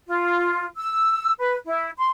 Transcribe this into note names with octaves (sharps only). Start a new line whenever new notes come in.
F4
E6
B4
E4
C6